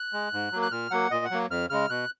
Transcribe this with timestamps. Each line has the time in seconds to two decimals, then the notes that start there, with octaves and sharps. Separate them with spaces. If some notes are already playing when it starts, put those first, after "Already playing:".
Already playing: F#6
0.13 G#3
0.33 G#2
0.52 F#3 A#3
0.62 F#6
0.72 A#2 F6
0.91 F#3 A#3 F#5
1.11 A#2 D#5
1.25 F#5
1.31 F#3 A#3
1.50 F2 F6
1.70 C#3 G#3 F6
1.89 B2 F#6